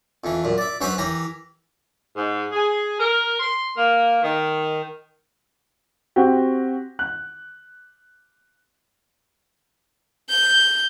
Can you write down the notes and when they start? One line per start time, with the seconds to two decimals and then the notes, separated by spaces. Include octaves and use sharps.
0.24 F2 E3
0.44 F#2 A#2
0.58 D5 E5
0.81 F#2 C#4 B4 C5 E5 B5
0.98 E3 G4 A#4
2.16 G#2
2.52 G#4
2.98 A#4
3.40 C6
3.76 A#3
4.22 D#3
6.16 C4 F#4 G4
6.99 F#6
10.29 G6